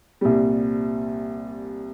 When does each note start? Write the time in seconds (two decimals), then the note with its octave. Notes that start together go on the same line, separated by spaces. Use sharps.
0.21 C2 A#2 G3